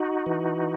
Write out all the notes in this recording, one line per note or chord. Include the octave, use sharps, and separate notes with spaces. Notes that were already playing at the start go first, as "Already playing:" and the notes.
Already playing: D#4 F#4
E3